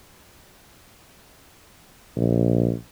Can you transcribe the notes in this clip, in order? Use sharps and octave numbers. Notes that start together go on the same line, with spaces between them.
A#1